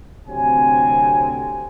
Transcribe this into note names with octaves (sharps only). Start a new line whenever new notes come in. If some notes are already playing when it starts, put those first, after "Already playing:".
D2 C3 F#3 C4 G#5